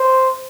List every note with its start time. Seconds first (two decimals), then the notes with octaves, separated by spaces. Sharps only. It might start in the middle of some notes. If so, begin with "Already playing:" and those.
Already playing: C5